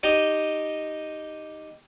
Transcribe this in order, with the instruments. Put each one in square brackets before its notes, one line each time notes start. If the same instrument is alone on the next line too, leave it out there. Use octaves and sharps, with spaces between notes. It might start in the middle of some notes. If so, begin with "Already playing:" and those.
[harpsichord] D#4 G4 D#5 D#6